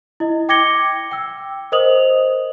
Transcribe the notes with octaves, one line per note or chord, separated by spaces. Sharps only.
E4 D#5
G5 D6 G#6 A#6 C#7 G7
G5 E6
A#4 C5 D#5 D#6 F7 F#7